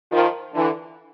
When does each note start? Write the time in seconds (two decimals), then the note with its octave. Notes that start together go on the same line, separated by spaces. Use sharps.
0.12 D#3 F3
0.54 D3 E3